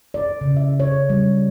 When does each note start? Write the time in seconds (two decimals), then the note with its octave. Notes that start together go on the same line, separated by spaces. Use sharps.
0.14 D5
0.41 C#3
0.57 E5
0.80 C#5
1.09 G3